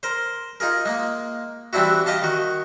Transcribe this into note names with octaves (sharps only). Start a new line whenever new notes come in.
A#4 C5
D#4 F4 G#4 A#4
G#3 A#3
E3 G3 C4 D4 E4 F#4
G4 D#5 F5 A5
D#3 F#4